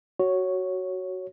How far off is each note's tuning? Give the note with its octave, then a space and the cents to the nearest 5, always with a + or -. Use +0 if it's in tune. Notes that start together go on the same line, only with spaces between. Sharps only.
F#4 +10 C#5 +0